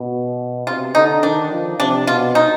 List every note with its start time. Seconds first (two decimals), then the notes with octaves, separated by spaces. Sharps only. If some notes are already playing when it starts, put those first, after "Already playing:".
Already playing: B2
0.67 C3 F4
0.95 D3 D#4
1.23 D#3 D4
1.51 F3
1.79 C3 D4
2.07 B2 F4
2.35 D#4